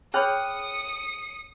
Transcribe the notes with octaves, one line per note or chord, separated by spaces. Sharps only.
G#4 C#5 G5 B5 D#6 F6 F#6 C#7